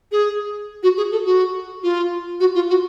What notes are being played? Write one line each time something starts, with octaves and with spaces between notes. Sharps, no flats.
G#4
F#4
G#4
A4
F#4
F4
F#4
F4
F#4